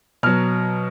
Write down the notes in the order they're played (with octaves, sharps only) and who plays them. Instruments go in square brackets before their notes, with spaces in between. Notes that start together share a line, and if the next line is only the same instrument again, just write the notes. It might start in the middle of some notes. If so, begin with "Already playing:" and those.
[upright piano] B2 F#3 F6